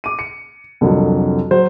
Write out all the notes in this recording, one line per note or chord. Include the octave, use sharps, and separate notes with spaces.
D6 D#7
C#7
C2 F2 D3 F#3
F#3 C5